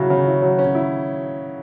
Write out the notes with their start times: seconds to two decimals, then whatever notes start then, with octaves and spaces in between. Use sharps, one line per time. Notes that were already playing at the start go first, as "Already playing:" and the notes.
Already playing: C#3 F#3 E4 F#4
0.10 C#3
0.26 E4
0.42 F#3
0.59 C#4
0.75 E4